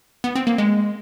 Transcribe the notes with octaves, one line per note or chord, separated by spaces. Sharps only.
B3
C4
A#3
G#3